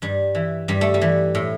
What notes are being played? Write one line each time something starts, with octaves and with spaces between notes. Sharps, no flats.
G2 G3
E3
G2 G3
A3
G3
E3
A2